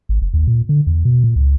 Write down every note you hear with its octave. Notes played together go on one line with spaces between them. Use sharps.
G#1
F#1
D#2
A#2
D3
E2
B2
A#2
C#2